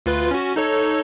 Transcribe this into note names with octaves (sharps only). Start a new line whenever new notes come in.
D2 F4 B4
C#4 F#4
D#4 A4 C#5